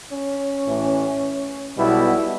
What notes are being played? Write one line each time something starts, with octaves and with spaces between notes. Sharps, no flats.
C#4
A1 A2 E3
B1 B2 G3 B3 E4